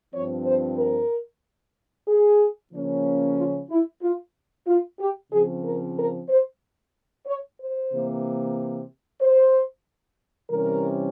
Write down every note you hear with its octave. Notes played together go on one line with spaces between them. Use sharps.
G2 F3 C4 C#5
C5
A#4
G#4
C#3 F3 A#3 C#4
F4
E4
F4
F4
G4
C#3 F3 C4 G#4
A#4
A#4
C5
C#5
C5
C3 E3 A#3
C5
C3 E3 G3 C#4 A#4